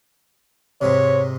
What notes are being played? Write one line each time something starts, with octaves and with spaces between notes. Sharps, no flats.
G#2 C3 C#5